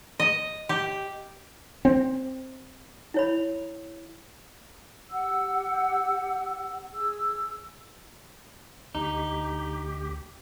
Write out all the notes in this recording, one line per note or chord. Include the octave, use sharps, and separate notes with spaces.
D#5
G4
C4
E4 C#5 B5
G4 F#5 E6
G#4 E6
D2 D#4 G4